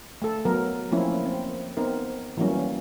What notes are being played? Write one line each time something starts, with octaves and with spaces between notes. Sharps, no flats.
A3 A4
F#3 B3 A#4
F3 A3 A#3 C4 C#4 E4
C4
B3 C4 D#4 A#4
E3 F#3 G3 A#3 C#4